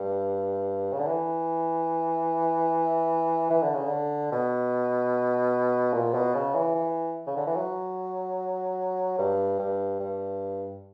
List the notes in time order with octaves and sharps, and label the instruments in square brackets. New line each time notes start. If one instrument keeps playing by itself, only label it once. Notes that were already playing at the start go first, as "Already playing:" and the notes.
Already playing: [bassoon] G2
C#3
D3
E3
E3
D3
C#3
D3
B2
A#2
B2
C#3
E3
E3
C#3
D3
E3
F#3
G2
G2
G2